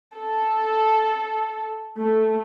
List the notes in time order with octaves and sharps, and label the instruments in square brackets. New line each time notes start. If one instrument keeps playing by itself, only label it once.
[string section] A4
A3